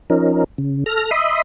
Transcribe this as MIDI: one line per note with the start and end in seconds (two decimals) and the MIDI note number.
0.10 0.44 53
0.10 0.44 61
0.10 0.44 63
0.10 0.44 70
0.58 0.84 49
0.86 1.11 69
0.86 1.11 89
0.86 1.11 94
1.11 1.42 75
1.11 1.42 76
1.11 1.42 83
1.11 1.42 84
1.11 1.42 87